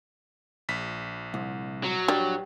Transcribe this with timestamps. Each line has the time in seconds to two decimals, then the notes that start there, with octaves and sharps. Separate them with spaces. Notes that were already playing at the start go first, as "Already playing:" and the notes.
0.69 A#1 B6
1.34 C2
1.84 F#3
2.08 G3 D4 B4 C#5